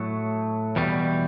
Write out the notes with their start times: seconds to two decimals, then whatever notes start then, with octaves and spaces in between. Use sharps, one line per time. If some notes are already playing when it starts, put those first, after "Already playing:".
Already playing: A2 F#3 A3
0.76 E2 B2 G3